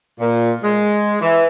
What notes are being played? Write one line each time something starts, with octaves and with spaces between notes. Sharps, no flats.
A#2
G#3
E3